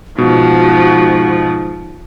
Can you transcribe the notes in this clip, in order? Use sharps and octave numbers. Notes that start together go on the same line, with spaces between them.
G#2 B2 F3 F#4